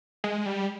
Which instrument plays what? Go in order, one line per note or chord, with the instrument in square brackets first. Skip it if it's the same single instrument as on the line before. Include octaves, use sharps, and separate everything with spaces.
[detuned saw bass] G#3
G3